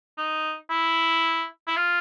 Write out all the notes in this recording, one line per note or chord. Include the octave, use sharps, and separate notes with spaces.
D#4
E4
E4
F4